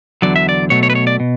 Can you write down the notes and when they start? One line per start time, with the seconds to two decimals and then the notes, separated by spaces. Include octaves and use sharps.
0.22 E2 D3 F#3 D5
0.36 E5
0.49 D5
0.70 B2 F#3 A3 C#5
0.83 C#5
0.90 B4
0.95 C#5
1.07 D5
1.20 B2